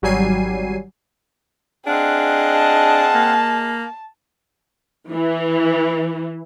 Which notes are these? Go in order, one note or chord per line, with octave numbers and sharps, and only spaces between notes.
G#1 F#3 G3 G#5 C7 D#7
C4 D4 G#4 D#5 F5 F#5
A5
A#3
E3